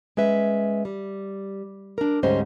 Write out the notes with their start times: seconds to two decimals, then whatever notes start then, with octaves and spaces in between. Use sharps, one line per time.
0.17 G#3 C#4 B4 E5
0.85 G3
1.98 D4 A#4
2.23 D2 G#2 G3 C#4 C5 D#5